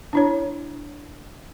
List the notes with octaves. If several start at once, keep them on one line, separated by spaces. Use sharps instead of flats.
D4 E4 C#5